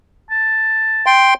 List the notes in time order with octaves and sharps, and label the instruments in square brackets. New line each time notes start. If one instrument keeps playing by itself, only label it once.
[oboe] A5
[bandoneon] G5 C6